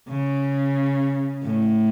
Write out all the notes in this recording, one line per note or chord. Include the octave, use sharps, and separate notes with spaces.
C#3
A2